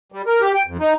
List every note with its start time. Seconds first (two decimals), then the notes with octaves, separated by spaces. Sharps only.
0.12 G3
0.27 A#4
0.42 G4
0.54 G5
0.67 F2
0.80 D#4